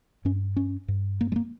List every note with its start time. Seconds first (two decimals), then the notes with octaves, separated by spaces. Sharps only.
0.25 G2 C#4
0.56 C#4
0.88 G2
1.21 A#3
1.32 G#3
1.36 A#3